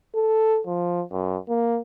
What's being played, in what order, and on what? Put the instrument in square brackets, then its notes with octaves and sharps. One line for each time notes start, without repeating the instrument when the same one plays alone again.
[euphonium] A4
F3
F#2
A#3